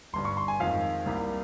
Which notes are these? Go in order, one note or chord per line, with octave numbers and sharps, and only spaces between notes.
G1 G2 G3 C6
C#6
C6
G#5
F2 D#3 G#3 F5
C2 C3 G3 A#3